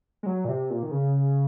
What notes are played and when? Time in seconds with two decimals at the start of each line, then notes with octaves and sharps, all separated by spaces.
0.23 G#3
0.26 F#3
0.45 A#2
0.49 C3
0.70 A#2
0.83 D#3
0.91 C#3